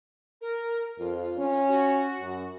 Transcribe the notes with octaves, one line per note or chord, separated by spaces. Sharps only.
A#4
F2 F4
C#4
F#4
F#2